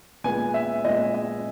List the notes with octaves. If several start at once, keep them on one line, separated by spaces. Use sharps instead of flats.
A#2 G#3 B3 G#5
E5
A#2 G#3 B3 D#5
D#5